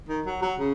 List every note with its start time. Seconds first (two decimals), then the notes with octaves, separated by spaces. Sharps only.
0.09 D#3
0.26 F#3
0.42 F#3
0.59 C#3